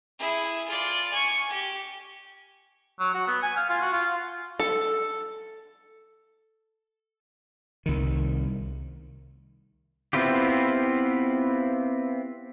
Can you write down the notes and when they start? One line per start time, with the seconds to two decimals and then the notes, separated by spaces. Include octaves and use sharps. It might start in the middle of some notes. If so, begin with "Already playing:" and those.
0.19 E4 G#4
0.68 F4 D5
1.12 G#5 C#6
1.50 G4
3.00 F#3
3.14 F#4
3.28 B3
3.42 G#5
3.57 F5
3.70 F4
3.81 F#4
3.93 F4
4.60 A4
7.86 C2 D#3
10.13 B3 C4 E4 F4 G4